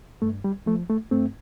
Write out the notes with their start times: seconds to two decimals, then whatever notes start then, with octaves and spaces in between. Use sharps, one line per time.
0.22 G2 A3
0.44 G3
0.66 F3 A3
0.90 A3
1.11 G2 A3 C4